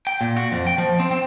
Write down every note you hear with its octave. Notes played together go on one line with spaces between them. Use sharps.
G5
A#2
F#4
F2
G5
F3
C4
C4